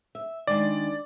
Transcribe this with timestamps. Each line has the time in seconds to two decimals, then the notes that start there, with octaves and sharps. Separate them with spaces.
0.15 E5
0.47 D#3 G#3 D4 D5